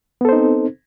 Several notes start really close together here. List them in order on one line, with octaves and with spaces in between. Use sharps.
B3 A4 C5 D#4 C4